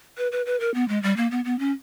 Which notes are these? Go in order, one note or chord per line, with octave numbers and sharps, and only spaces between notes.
B4
B4
B4
A#4
B3
G#3
G3
A#3
B3
B3
C#4